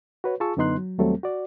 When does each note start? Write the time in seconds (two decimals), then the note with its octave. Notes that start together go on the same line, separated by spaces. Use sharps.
0.24 F#4 B4 C#5
0.40 F4 G#4 A5 C#6 E6
0.57 F#2 D3 B3 D#4 C6 F#6
0.77 F#3
0.98 D#2 F#3 G3 A3 C4 A4
1.23 F#4 D5